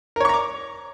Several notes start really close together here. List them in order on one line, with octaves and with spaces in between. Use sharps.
A#4 C#5 C#6 A#5 D6